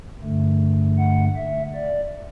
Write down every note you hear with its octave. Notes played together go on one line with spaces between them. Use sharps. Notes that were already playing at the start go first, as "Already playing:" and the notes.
G2 D3 A3
F#5
E5
D5